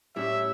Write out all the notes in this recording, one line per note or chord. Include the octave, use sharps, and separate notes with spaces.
A2 G3 C#4 E4 E5